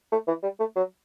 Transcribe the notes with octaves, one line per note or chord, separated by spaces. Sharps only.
A3
E3
G3
A3
F#3